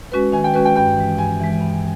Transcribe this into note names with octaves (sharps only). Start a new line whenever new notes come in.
G#3 C#4 F#4 B4
D#3 G#5
G5
G#3 C#4 F#4 B4
G5
G2 G5
E3 G#3
G2 G#5
E3 G#3
G2